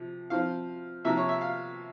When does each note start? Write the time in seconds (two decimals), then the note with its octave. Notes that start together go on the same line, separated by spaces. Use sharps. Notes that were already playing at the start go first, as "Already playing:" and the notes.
Already playing: C3 F3
0.30 F3 C4 F5
1.05 C3 F3 A#3 E5
1.17 C#5
1.29 E5
1.41 F5